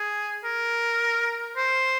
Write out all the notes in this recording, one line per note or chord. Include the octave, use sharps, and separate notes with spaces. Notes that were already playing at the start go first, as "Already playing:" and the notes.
Already playing: G#4
A#4
C5